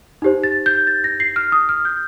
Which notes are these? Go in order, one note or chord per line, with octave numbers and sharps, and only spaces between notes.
D#4 G4 C5
A6
G6
A6
A#6
C7
F6
D#6
F6
G6